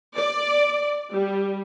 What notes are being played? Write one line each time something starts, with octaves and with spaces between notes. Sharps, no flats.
D5
G3